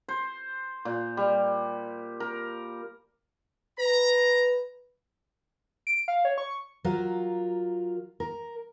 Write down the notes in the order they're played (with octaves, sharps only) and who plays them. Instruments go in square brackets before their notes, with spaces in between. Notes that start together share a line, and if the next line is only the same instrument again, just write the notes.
[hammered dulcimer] C5
A#2
G3
A#4
[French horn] B4 [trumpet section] A#5
[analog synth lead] D7
F5
C#5
C#6
[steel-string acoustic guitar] F#3 F4 A#4
A#4